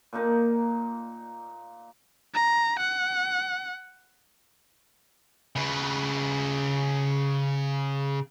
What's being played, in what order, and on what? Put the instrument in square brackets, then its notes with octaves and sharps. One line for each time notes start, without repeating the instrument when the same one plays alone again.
[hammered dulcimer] A#2 A#3 D#4
[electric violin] A#5
F#5
[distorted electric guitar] C#3 B4